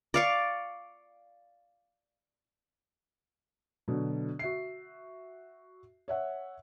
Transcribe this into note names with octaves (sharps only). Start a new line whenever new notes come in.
D5 F5 C#6
B2 D3 F#3
F#4 E5 C7
C#5 E5 F#5